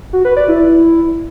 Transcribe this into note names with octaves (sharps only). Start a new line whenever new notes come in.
F#4
B4
D5
E4